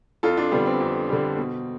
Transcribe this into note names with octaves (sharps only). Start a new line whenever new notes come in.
F2 F4 A4
D4 F4
D3 G3 B3 D4
C4
F2
D3 G3
B2